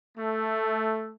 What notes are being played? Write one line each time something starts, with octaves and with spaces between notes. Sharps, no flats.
A3